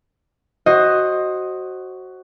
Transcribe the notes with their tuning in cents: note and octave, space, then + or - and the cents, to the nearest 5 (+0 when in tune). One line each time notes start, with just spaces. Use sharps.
F#4 +10 C5 +25 D#5 +0